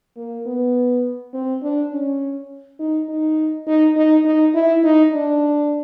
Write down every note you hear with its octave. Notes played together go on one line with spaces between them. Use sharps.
A#3
B3
C4
D4
C#4
D#4
D#4
D#4
D#4
D#4
E4
D#4
D4